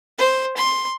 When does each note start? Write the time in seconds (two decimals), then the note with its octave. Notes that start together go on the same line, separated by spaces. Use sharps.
0.18 C5
0.57 C6